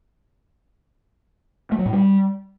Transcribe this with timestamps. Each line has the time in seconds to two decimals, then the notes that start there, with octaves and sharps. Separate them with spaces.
1.72 A3
1.79 F#3
1.86 A2
1.93 G3